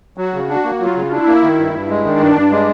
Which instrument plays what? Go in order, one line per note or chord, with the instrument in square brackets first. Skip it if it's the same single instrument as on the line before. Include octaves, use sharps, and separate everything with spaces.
[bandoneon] F#3 [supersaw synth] F#4
[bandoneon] C#3
[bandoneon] D4 [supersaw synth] F#4
[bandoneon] A#3
[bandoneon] F#3 [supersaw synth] F4
[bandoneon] C#3
[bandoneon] D4 [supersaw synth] E4
[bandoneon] A#3
D#3
G2
G2
G#3
[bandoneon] D#3 [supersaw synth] D4
[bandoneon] G2
G2
G#3